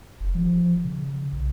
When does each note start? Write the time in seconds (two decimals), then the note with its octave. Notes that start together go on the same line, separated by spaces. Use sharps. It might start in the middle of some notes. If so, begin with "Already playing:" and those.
0.20 F1
0.35 F3
0.84 C#3
1.33 B1